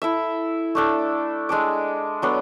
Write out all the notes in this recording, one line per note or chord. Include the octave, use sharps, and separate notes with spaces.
E4 A4 E5
A3 D4 A4
G#3 D4 A4 D5
F#3 B3 D4 A4